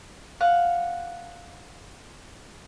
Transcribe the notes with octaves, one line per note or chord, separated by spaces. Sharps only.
F5 F#5